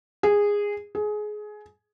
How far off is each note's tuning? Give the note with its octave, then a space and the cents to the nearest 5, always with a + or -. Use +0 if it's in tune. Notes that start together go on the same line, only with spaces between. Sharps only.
G#4 -15
G#4 +20